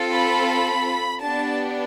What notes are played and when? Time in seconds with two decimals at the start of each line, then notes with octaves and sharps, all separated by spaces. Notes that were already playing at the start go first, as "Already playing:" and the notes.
Already playing: C4 F4 A4
0.14 B5
1.22 B3 D4 G4 A5